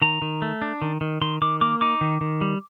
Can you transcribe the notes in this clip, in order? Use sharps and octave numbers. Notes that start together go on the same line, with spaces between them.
D#3 A#5
D#3
A3
D4
D#3
D#3
D#3 C6
D#3 D6
A#3 D6
D#4 D6
D#3
D#3
G3